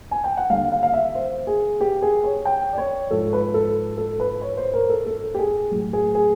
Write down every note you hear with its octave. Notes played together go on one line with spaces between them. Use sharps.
G#5
G5
F#5
D#2 D3 G3 F5
F5
F5
E5
C5
G#4
G4
G#4
C#5
G5
D5
C#5
G#2 F3 A4
B4
A4
A4
B4
C#5
C5
A#4
A4
A4
G4
G#4
A2 F#3
G#4
G#4